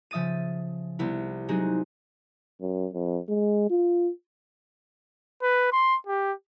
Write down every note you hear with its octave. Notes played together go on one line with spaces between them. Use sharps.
C#3 F3 E5 D#6 A6 D#7
C2 B3 E4
F#3 G#3 C4 D#4 F#4 G#4
F#2
F2
G#3
F4
B4
C6
G4